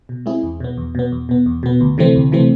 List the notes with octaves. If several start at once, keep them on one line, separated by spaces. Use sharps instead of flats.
B2
G#3 C4 E4 G#4
E2
B2 B3
E2
B2 B3
E2
B2 B3
E2
B2 B3
D2
C3 E3 A3 C4
D2
C3 E3 A3 C4